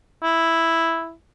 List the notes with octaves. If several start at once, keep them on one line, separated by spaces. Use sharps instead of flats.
E4